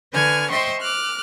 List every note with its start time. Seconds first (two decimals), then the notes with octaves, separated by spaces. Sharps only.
0.12 D3 B4 G#5 C#6 F6 G#6
0.50 C5 D#5 E5 G5 C6 C#6
0.80 D6 F6 F#6